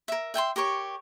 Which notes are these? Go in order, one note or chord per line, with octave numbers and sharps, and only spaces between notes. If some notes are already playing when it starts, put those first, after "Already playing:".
A#4 E5
E5 G5 G#5 C6
G4 A#4 C#5 C#6